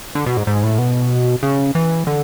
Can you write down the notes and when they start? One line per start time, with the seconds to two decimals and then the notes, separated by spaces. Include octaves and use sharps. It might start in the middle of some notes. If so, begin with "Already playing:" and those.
0.15 D3
0.26 B2
0.37 G#2
0.47 G#2
0.63 A2
0.78 B2
1.43 C#3
1.75 E3
2.07 D3